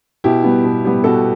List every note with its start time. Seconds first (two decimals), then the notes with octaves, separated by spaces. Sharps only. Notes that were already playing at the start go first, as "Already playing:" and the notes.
0.24 B2 E4 G4
0.44 G3 B3
0.64 B2
0.85 G3 B3
1.04 B2 F#4 A4